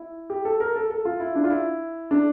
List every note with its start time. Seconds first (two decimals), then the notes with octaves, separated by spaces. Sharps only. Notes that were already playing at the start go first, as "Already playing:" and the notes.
Already playing: E4
0.30 G4
0.45 A4
0.60 A#4
0.76 A4
0.90 A4
1.05 F4
1.20 E4
1.35 D4
1.44 F4
1.50 E4
2.11 D4